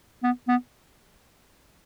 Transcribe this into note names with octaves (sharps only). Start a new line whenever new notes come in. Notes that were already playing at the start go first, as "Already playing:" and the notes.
B3
B3